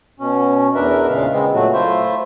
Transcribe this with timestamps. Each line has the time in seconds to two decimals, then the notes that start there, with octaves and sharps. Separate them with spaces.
0.20 B2 C#4
0.75 E2 D4 A#4 B4 E5
1.08 A#2 C#3 G#3 F5
1.32 C#3 G#3 B3 C4
1.54 A#2 F#3 A3 F#4
1.73 A3 E4 F4 C5 E5